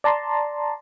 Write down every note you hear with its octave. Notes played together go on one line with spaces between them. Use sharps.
D5 A5 A#5 C6